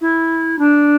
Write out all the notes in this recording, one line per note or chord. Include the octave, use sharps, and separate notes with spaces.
E4
D4